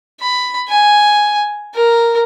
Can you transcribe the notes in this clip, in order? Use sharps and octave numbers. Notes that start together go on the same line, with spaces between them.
B5
G#5
A#4